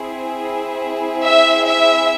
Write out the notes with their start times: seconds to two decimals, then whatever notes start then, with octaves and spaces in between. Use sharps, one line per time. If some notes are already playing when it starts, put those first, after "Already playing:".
Already playing: C4 E4 G#4
1.23 E5
1.66 E5